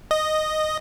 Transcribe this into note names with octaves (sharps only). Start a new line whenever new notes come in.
D#5